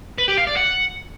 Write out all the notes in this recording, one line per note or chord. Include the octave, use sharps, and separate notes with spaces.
B4
G4
F5
D5
F#5